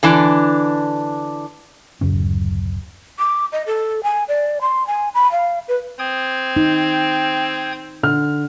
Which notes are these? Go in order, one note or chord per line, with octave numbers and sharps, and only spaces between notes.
D3 E3 D4
D1 F#2 C#3 C#4
D6
D#5
A4
G#5
D5
C6
G#5
B5
F5
B4
C4 G5 D#6 G#6
D#4
D3 F6